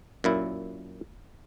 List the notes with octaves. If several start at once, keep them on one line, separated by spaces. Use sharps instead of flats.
F#2 A#2 E4